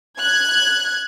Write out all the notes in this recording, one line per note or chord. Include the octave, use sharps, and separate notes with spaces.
F#6 G#6